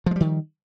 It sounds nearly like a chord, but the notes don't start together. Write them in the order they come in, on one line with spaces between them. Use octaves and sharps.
F3 G#3 G3 D#3